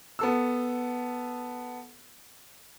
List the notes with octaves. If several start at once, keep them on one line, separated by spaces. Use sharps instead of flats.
B3 A4 E6